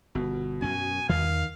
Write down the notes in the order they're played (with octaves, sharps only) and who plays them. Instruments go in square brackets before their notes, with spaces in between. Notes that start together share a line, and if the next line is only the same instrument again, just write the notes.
[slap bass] G1 [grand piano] B2
[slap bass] F#2 C#4 [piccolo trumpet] G#5
[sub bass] E2 [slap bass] D#3 [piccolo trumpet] F5